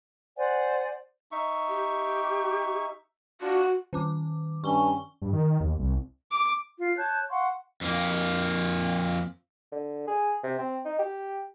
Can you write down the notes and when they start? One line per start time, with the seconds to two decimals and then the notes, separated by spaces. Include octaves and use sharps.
0.37 C5 D5 F#5 G#5
1.32 D#4 E5 C#6
1.69 G4
3.41 D4 F4 F#4
3.93 D#3 C#4 D6
4.64 G2 C#4 C#6 G7
5.22 G2
5.33 D#3
5.60 D#2
5.79 C2
6.31 D6
6.81 F4
6.97 C#5 A5 F#6 G6
7.31 F5 F#5 C6 C#6
7.81 F2 A#3
9.72 D3
10.07 G#4
10.43 C3
10.58 C4
10.85 D#4
10.99 G4